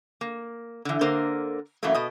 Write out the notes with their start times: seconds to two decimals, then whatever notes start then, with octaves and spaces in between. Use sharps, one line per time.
0.21 A#3
0.85 D3 E3
1.01 D3 A#3 A#4 C5
1.83 F#2 E3 F#3 A3 A#3
1.94 B2 D#5